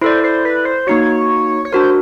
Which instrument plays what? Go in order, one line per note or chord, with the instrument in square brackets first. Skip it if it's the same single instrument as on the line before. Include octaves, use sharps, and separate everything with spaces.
[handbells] E4 A4 D5 [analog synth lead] C5
[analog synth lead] C5
B4
C5
[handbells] A#3 D#4 F#4 [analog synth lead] C#5
[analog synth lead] C#5
[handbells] D4 F#4 A#4 [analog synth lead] C5